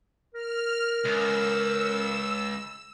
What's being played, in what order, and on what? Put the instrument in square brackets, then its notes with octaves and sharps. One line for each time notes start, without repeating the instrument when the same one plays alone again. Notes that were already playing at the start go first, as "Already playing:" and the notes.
[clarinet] A#4 [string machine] F6
[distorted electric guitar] C#2 [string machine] E6